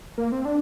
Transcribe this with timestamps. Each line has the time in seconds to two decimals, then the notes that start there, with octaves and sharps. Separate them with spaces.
0.18 A#3
0.32 C4
0.45 D4